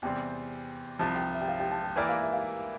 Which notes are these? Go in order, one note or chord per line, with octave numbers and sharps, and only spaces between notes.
E2 C3 G3 C4 G5
C2 C3 F3 A5
G5
E5
G5
F5
G5
A5
G5
E3 A#3 E4 A#4 D5 G5
F5
E5
F5